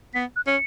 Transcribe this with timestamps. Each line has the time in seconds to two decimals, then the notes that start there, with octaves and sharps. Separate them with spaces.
0.14 B3 B6
0.36 F#6
0.47 C#4 C#7